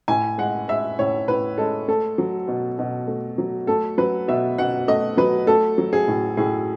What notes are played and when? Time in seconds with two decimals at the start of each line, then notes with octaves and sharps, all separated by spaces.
0.08 A2 G#5
0.38 G#3 F#5
0.68 G#3 E5
0.99 A2 C#5
1.28 A2 B4
1.58 G#3 A4
1.88 A3 A4
2.18 F#3
2.48 B2
2.79 B2
3.08 A3
3.38 F#3
3.67 A3 A4
3.98 F#3 B4
4.28 B2 E5
4.58 B2 F#5
4.88 A3 D#5
5.17 F#3 B4
5.47 A3 A4
5.78 F#3
5.93 G#4
6.08 A2
6.37 A2 G#4